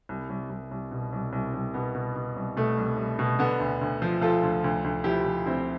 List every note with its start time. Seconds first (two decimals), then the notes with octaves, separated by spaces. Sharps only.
0.09 C2
0.30 C2
0.50 C2
0.71 C2
0.91 B2
1.13 C2
1.33 C2
1.54 C2
1.74 B2 B3
1.95 B2
2.15 B2
2.36 C2
2.57 B2 A3
2.78 C2
2.98 C2
3.19 B2
3.39 D3 B3
3.60 D2
3.81 D2
4.02 F3
4.21 F3 F4 A4
4.43 D2
4.64 D2
4.84 D2
5.04 F3 E4 G4
5.25 F3
5.45 D2 C4 E4